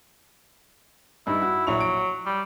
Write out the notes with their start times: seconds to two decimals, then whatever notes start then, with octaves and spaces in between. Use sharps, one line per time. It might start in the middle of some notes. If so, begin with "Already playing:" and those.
1.27 G2 D#4 E4
1.42 F#4
1.67 A#1 F#3 E4 F7
1.81 D7
2.26 G3